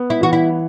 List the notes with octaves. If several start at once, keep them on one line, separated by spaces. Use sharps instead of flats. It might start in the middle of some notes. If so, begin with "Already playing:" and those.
Already playing: B3
E4
E3 F#4
E4